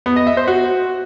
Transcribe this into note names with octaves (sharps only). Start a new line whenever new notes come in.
B3
D#5
E5
C5
F#4